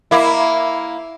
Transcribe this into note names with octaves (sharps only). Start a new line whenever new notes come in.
A#3 E4